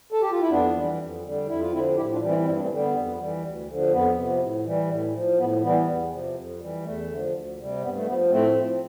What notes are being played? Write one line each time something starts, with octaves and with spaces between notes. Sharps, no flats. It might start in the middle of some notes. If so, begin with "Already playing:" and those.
A4
G4
F4
E4
F2 B3 D4
E3 G3
F2
D3 G3
F2 E4
F4
D3 F3 C4 E4
A2 E4 G4
D4 F4
E3 G3
C4 E4
G2 C4 E4
D4
A3 C4
D3 G3
B3
F2
E3 G3
D2
D3 F3
F2 B3
C3 F3
A2
E3 G3
A2
F3
A2 B3
E3 G3 B3
E2
C3 F3
F2
E3 G3
E2 A3
D3 F3
D2
C3 G3
G2 B3
A3
F3 B3
A2 A3 C4
F3